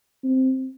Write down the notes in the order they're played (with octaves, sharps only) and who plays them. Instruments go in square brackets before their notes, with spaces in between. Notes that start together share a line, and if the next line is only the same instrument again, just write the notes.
[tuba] C4